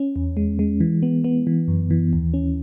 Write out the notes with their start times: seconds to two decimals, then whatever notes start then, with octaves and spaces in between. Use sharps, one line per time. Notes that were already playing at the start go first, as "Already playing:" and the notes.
Already playing: C#4
0.16 E2
0.37 G#3
0.59 G#3
0.80 E3
1.03 B3
1.24 B3
1.47 E3
1.68 F#2
1.91 E3
2.13 D#2
2.34 C#4